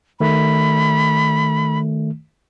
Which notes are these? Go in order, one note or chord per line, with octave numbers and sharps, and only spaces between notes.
D#3 A3 B5